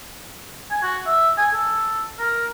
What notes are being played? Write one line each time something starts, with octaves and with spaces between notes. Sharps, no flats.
G#5
F#4
E5
G#5
A4
A#4